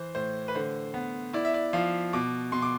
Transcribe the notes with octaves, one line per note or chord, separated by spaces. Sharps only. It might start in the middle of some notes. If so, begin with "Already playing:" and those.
Already playing: E3 C5
A2 C5
B4
D3 C5
B3
E4 D5
E5
D5
F3 F5
B2 D6
B2 C6
D6